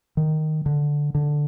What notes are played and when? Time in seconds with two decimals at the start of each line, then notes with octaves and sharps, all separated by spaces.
0.17 D#3
0.66 D3
1.15 D3